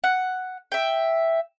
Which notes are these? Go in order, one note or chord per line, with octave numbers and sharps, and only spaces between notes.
F#5
E5 G5